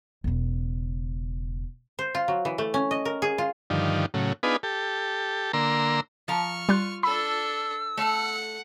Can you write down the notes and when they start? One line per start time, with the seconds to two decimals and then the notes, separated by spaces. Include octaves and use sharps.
0.24 E1 C#3
1.99 C5
2.15 F4
2.28 F#3
2.45 E3
2.58 A3
2.74 C#4
2.91 D#5
3.05 A#4
3.22 G#4
3.38 F4
3.70 G2 D3 D#3 F3
4.14 A2 C#3 F#3
4.43 B3 D4 D#4 F4 G#4 B4
4.63 G4 A4
5.53 D3 A#3 A#5 C6 E6
6.28 F3 A#5 C#6 F6
6.69 G3 F4 F#6
7.03 D4 A4 B5 E6
7.97 A3 F#5